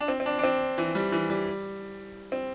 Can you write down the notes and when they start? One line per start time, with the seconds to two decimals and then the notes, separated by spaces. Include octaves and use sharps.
0.01 D4
0.08 C4
0.20 C4
0.26 D4
0.39 D4
0.43 C4
0.78 E3
0.95 G3
1.12 E3
1.30 G3
2.32 C4